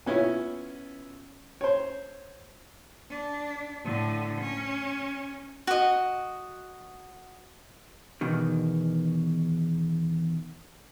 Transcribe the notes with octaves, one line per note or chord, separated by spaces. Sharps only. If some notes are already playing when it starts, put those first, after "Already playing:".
B3 C#4 E4 F4 C#5
C5 C#5
D4
A2 D3
C#4
F#4 D#5
E2 B2 D#3